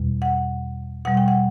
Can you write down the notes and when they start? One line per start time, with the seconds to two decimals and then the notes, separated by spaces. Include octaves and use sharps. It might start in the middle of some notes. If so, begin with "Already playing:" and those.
Already playing: E2 B2 G3
0.22 F#5
1.05 B2 G3 F#5
1.17 G5
1.28 F#5